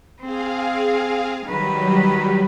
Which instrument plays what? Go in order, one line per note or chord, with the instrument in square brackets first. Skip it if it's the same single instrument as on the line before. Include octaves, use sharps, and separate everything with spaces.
[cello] C4 [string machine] G#4 F5
[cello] D#3 B4 [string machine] F#3 G3